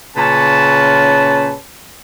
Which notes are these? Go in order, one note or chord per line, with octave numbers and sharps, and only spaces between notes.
A#2 C#3 C#4 B4 A5